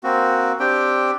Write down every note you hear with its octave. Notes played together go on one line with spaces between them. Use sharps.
A#3 C4 F#4
C4 D4 G4 G5